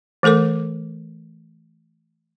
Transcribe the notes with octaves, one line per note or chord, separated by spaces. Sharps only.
E3 A3 A4 A#4 D6